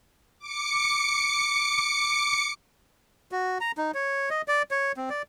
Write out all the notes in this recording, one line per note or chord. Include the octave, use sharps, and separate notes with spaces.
D6 C#7
F#4
A#5
D#4
C#5
D#5
D5
C#5
C4
D5